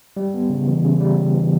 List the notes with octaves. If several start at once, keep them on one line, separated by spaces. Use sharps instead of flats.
G3
B3
C#3
E3
C#3
G3
G3
E3